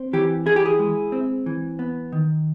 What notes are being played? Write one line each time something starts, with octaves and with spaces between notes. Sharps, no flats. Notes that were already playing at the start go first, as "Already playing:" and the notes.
Already playing: C4
E3 G4
E4 G#4
G4
G#4
G#3
C4
E3
B3
D#3